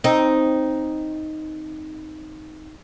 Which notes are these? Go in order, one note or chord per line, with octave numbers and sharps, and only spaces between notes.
C4 D#4